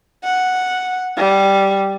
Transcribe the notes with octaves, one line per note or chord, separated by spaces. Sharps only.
F#5
G3